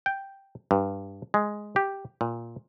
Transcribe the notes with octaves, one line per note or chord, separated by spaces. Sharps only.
G5
G2
G#3
G4
A#2